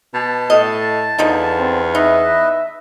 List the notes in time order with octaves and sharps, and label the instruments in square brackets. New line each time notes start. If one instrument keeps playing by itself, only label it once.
[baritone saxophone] B2 [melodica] A5
[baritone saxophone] A2 [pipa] D#5
[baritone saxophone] E2 [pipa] D3 F3 D#4
[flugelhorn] C4
[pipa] D#4 [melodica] B4 D#5 [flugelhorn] E5